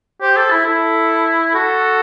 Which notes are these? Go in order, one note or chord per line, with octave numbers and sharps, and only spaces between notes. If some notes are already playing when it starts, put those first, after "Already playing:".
G4 C5
A4
E4
E4 A4
F#4 A4